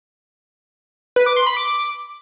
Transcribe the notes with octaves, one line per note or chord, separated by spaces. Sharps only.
B4
D6
C6
B5
D6